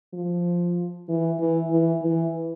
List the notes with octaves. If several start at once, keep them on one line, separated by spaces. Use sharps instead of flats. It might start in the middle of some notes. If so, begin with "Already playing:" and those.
F3
E3
E3
E3
E3